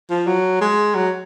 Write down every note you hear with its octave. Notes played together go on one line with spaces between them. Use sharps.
F3
F#3
G#3
F#3